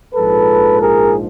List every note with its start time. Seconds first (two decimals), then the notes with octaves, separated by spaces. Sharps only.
0.14 A#1 G#2 F3 G#3 A4 B4
0.80 G#4 A#4